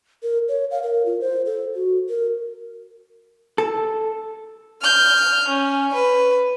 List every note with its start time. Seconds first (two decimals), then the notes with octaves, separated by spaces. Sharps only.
0.23 A#4
0.48 C#5
0.71 F5
0.83 A#4
1.06 F4
1.21 C5
1.46 A4
1.75 F#4
2.09 A#4
3.58 A4
4.82 F6 G6
5.49 C#4
5.94 B4